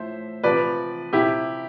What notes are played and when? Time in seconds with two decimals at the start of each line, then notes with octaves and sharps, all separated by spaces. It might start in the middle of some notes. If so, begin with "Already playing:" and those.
Already playing: A2 F3 C5 E5
0.43 C3 F3 B4 D5
1.13 C3 F3 E4 G4